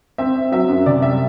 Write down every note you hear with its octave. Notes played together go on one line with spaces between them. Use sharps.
C4 E5
C4
F#3 E5
F#2
C3 D5
G3 E5